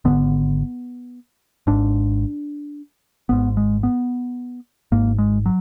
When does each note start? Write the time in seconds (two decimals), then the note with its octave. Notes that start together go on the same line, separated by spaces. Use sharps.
0.05 G#1 F#2 D3 B3
1.67 G#1 G#2 D4
3.29 G#1 G#2 B3
3.57 G#3
3.83 B3
4.92 G#1 G#2 A#3
5.18 G#3
5.46 F#3